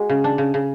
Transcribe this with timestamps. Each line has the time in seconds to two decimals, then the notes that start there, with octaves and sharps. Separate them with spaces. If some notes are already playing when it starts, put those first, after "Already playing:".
Already playing: G#3 F#4
0.09 C#3
0.24 D4
0.38 C#3
0.54 C#3